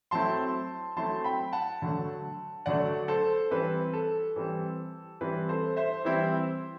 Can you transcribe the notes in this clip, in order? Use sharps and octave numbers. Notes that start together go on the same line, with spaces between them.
F#3 A3 C4 E4 A5 C6
F#3 A3 C4 E4 A5 C6
G5 B5
F#5 A5
D3 F#3 A3
D3 F#3 A3 D5 F#5
A4 C5
E3 G3 C4 B4
A4
E3 G3 C4
E3 G3 C4 E4 B4
A4 C5
C5 E5
E3 G3 C4 E4